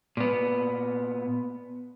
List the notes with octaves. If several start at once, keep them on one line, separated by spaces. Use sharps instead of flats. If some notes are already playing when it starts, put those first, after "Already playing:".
A#2 B3